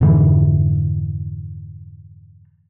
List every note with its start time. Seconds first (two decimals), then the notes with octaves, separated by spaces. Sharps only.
0.01 F2 G#2 D3 E3